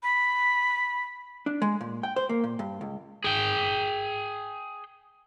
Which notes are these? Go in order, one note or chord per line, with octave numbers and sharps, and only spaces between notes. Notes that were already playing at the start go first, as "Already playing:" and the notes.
B5
D4
G#3
A#2
G5
C5
A#3
A#2
G2
C#2
G#4 G5